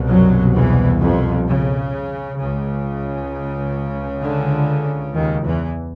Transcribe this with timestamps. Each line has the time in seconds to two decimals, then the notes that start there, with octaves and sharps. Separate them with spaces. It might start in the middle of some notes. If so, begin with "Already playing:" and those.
Already playing: C2 B2
0.09 F#2 F#3
0.55 E2 E3
1.01 F2 F3
1.47 C#3
2.39 C#2 C#3
4.23 D3
5.15 D#2 D#3
5.45 E2 E3